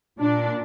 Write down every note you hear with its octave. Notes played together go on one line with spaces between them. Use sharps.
A#2 D4